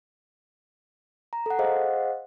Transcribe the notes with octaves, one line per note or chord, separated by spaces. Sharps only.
A#5
A4 F#5
G#4 C5 D#5 F5 F#5